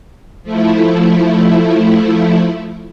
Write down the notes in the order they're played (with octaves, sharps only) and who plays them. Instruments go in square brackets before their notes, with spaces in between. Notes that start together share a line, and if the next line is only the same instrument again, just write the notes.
[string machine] F3 A3 E4